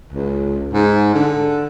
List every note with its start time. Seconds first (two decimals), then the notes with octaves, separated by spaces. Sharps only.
0.13 C#2
0.73 G#2
1.15 D3